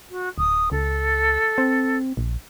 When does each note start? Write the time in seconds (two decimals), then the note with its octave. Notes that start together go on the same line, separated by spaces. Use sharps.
0.10 F#4
0.38 D1 D#6
0.72 C#2 A4
1.58 C4
2.17 A#1